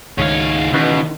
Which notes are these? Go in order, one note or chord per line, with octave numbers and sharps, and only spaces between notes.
C#2 G#2 D#3 C#5 F5
C#2 B2 D#3 E3 C#4